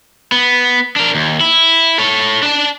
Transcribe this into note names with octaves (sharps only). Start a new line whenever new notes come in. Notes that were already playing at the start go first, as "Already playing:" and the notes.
B3
D4 A#4
D#2
E4
A4 C#5
D4 A5